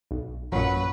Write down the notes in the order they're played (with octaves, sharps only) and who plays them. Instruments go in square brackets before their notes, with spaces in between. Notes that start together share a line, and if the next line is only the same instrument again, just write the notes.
[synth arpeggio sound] B1
[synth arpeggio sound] A1 A#2 [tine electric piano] F#2 [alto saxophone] F#3 [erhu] B4